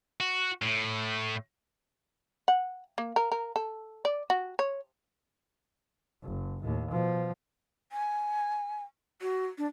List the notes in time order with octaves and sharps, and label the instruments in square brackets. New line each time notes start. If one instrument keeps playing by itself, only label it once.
[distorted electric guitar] F#4
A2
[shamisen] F#5
A#3
A#4
A#4
A4
D5
F#4
C#5
[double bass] F#1
D#2 A2
B2 F3
[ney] G#5
F#4
D4